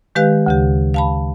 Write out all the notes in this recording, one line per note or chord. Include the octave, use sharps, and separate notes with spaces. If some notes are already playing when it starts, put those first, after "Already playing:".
D#3 G#3 G4 B4 F5 F#6
D2 C#3 G4
F5 A5 B5